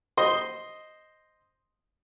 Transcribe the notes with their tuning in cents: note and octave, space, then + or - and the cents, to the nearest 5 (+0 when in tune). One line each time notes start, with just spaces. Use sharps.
C5 +0 D#5 +0 C6 +0